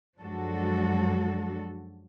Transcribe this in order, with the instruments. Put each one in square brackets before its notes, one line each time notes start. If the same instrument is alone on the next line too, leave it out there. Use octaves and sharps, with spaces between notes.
[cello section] F#2 F3 G#3 D4 F#4 A4